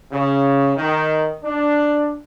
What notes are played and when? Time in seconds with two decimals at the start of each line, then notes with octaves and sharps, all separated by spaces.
0.11 C#3
0.75 D#3
1.43 D4